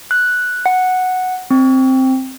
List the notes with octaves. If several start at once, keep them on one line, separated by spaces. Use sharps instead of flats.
F#6
F#5
C4